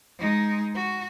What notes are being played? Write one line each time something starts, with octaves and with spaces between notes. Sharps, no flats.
G#3 D#4
F#4